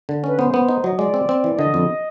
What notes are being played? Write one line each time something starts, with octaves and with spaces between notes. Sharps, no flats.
D3
C#4 B4
B3 C5
B3
D#4
F#3 D#5
G#3 D5
C4
C4
E3
D5
D3 D#5
F2